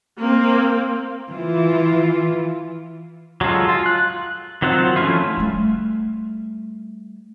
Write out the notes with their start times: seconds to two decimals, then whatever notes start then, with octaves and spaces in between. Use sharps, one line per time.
0.19 A#3 C4
1.31 E3 F4
3.41 F#3 G#3 F4 A4
3.69 F4
3.86 F#6
4.62 D#3 F#3 C4 F4 F#5
4.96 F3 A3 C#4 E4 F4
5.37 G3 A3